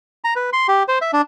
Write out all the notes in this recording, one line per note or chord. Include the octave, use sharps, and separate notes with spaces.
A#5
B4
C6
G4
C5
E5
D4